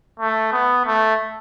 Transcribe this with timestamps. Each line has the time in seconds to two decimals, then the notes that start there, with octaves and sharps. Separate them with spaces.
0.19 A3
0.52 B3
0.85 A3